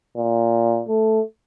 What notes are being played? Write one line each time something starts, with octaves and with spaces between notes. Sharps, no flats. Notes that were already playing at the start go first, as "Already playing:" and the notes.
A#2
A3